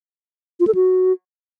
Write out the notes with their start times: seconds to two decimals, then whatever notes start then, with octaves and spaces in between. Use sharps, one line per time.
0.60 F4
0.67 A4
0.75 F#4